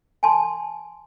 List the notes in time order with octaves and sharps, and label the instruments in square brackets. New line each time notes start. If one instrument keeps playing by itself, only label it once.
[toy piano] G#5 A5 C6